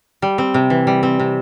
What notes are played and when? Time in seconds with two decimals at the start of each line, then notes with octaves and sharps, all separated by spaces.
0.22 G3
0.38 C4
0.54 C3
0.70 E3
0.87 G3
1.03 C4
1.19 C3